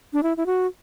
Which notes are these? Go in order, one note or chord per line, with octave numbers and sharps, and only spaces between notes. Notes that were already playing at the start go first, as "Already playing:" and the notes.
D4
E4
E4
F#4